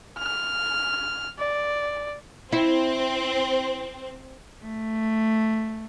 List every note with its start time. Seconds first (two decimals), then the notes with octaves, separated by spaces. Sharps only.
0.18 F6
1.39 D5
2.52 C4 E4
4.64 A3